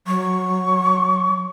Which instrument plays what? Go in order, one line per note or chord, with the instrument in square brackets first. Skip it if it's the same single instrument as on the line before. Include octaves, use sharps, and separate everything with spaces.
[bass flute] F#3 [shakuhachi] C#6